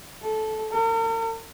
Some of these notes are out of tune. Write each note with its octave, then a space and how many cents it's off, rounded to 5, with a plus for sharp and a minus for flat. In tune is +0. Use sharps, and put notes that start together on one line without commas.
A4 -15
A#4 -45